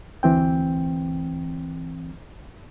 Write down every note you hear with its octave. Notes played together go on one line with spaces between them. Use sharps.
D2 E3 C4 G5